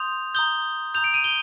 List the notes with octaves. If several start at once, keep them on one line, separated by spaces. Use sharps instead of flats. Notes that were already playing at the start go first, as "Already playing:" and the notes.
Already playing: C6 D#6 G6 F7
A#5 D#6 G6 G7
A#5 D#6 G6 F7
D7
D#7
G7